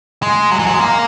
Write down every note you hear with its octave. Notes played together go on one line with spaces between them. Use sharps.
G#3
F#3
E3
F#3
G#3
A#3